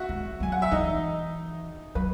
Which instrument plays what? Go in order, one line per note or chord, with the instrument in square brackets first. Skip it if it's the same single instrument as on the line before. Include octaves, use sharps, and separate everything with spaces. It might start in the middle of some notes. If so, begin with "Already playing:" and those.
Already playing: [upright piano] F#4 E5 F#5
[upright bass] G#3
[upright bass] F#3 [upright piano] G#5
[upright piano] F#5
E5
[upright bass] E3 [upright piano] D#4 D#5
[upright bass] F#3 [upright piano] B4